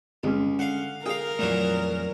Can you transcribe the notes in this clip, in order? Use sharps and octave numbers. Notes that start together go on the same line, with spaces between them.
G1 C#2 G#3 C#4
D3 F5 F#5
G#4 A#4 F5 G5
F2 A#2 E3 F#3 A3